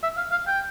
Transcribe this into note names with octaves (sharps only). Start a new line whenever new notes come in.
E5
F5
F5
G5